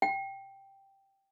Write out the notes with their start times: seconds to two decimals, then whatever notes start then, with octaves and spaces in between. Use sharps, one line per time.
0.02 G5